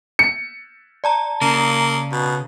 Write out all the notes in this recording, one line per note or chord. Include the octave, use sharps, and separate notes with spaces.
C#7
D5 A5 A#5
C#3 A#3
B2